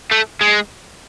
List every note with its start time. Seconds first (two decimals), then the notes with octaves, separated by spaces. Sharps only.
0.12 A3
0.41 G#3